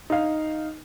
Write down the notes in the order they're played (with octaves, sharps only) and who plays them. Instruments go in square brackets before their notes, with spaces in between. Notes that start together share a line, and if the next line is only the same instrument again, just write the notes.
[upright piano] D#4 F5